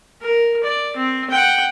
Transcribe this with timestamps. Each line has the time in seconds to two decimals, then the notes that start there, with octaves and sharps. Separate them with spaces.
0.22 A#4
0.64 D5
0.97 C4
1.30 F#5 G5